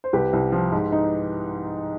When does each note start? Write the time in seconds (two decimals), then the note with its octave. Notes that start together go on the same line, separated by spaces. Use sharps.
0.04 C5
0.13 C2 G4 B4
0.33 C2
0.52 F3
0.72 G#2
0.92 D#4